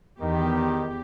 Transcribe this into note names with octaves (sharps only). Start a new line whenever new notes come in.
E2 D#3 G4